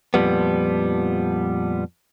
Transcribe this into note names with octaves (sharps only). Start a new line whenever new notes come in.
F2 A#2 F3 G3 B3